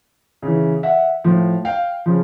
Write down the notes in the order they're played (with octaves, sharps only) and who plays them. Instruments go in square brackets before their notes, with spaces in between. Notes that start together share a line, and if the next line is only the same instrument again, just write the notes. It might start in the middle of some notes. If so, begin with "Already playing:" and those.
[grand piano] C#3 E3
E5 F#5
A2 F3
F5 G5
C#3 F3